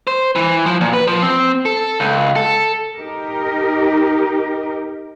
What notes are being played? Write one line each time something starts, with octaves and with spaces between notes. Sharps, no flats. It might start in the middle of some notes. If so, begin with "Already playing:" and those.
C5
E3
F3
A#2
B4
F3
C4
A4
C#2
A4
D#4 G4 A#4